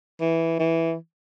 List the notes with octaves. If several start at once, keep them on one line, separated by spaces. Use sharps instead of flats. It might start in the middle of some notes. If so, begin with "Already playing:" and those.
E3
E3